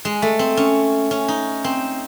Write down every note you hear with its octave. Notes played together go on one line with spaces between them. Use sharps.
G#3
A3
C4
C#4
C#4
D#4
C4